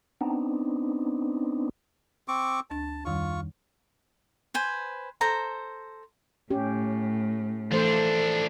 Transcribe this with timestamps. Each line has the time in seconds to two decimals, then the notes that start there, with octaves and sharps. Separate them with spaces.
0.21 B3 C4 D4 D#4
2.28 C4 C#6 D6
2.70 D2 D4 A5 A6
3.05 F2 D#3 G3 F4 C#6
4.54 B4 C5 G#5
5.21 A4 C5 A#5
6.50 A2 C#4 G4
7.72 E3 F3 A3 D4 A4 C5